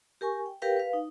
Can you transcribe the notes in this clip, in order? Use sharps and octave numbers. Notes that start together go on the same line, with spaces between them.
G4 A#4 G#5 C#6
G5
G4 A#4 B4 F5 G5
B4 F5
D#4